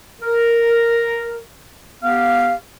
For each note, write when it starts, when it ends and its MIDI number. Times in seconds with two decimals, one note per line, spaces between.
0.21 1.38 70
2.02 2.53 59
2.02 2.53 67
2.02 2.53 77